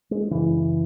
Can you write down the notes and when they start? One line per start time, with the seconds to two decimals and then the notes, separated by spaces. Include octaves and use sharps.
0.11 G#3
0.31 F#2 C#3 E3